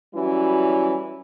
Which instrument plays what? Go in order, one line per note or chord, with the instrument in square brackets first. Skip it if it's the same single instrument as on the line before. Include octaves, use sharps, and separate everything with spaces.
[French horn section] E3 F#3 G3 C#4 E4 F#4